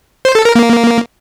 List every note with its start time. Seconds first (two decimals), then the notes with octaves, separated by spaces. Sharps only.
0.25 C5
0.35 A4
0.45 A#4
0.55 A#3